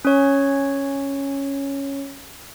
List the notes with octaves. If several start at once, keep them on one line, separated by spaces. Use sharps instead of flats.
C#4 C#5